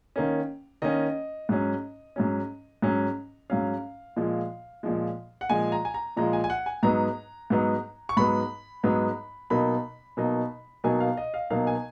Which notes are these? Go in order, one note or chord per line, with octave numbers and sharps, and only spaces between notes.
D#3 A#3 C#4
D#3 A#3 C#4 D#5
G#2 F#3 C#4
G#2 F#3 C#4
G#2 F#3 C#4
G#2 F#3 C#4 F5
A#2 F3 G#3
A#2 F3 G#3
F#5
A#2 F3 G#3 G#5
A#5
G#5
A#5
A#2 F3 G#3 A#5
G#5
G#5
F#5
G#5
G#2 F#3 B3 D#4 A#5
G#2 F#3 B3 D#4
C#6
G#2 F#3 B3 D#4 B5
G#2 F#3 B3 D#4
B2 F#3 A#3 D#4 B5
B2 F#3 A#3 D#4
B2 F#3 A#3 D#4 G#5
F5
D#5
F5
B2 F#3 A#3 D#4 F5
G#5